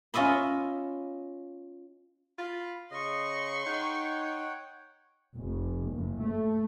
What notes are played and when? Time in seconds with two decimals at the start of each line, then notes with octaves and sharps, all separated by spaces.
0.14 C#4 F4 D#5 E5 B5
2.38 F4 B5
2.91 C#3 D#5 C6 C#6
3.66 D#4 C#5 F#5 G5
5.35 F1
5.90 F#1
6.21 A3